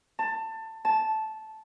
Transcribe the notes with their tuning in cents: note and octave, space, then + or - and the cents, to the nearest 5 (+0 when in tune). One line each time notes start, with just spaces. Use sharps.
A5 +20
A5 -10